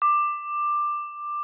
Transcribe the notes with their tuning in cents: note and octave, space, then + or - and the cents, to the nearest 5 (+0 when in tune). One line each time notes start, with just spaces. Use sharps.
D6 +15